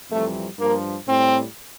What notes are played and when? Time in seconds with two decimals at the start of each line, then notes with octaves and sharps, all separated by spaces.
0.10 F2 C3 E3 G3 A3
0.59 G2 F3 A#3
1.08 A2 G3 C4